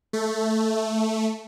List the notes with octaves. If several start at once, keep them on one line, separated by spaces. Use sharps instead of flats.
A3